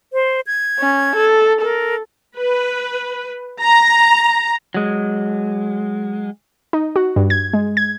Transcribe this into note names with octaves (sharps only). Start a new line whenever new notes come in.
C5
G#6
C#4
A4
A4 A#4
B4
A#5
F#3 G#3
D#4
F#4
G2
G#6
G#3
G#6